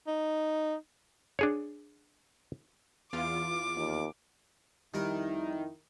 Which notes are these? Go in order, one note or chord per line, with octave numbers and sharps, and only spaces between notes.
D#4
D4 G#4 C#5
E2 F4 D6
D#2
F2 D#3 G3 D#4 E4 A#4